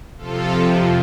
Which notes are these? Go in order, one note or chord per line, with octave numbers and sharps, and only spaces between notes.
F2 C3 F3 F4 A4